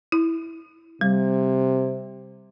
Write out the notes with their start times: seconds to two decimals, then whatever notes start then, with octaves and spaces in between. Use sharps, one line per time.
0.12 E4
1.01 C3 G3